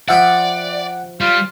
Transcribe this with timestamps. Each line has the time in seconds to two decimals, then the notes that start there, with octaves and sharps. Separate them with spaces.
0.08 F3 D5 E5 F#5 G5 B5
1.21 G3 F4